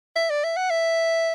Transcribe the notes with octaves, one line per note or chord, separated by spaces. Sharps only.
E5
D5
E5
F#5
E5